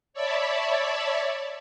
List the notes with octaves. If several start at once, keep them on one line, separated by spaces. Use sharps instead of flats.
C#5 D5 E5 A5 B5